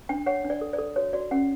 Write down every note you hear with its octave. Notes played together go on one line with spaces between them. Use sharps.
D4 G5
C#5 F#5
D4
D5
A4
D5
A4
F#4 C#5
F#4 D5
C#4 F#5